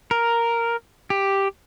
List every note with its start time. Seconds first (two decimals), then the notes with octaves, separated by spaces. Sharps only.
0.11 A#4
1.10 G4